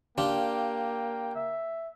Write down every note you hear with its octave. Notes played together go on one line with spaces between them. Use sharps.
A#3 D4 F4 G4 G5
E5